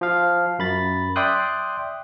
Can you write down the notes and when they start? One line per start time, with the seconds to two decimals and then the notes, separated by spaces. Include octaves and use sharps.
0.01 F3 F5
0.59 F#2 B5 A6
1.16 D5 E5 G5 C6 D#6 F#6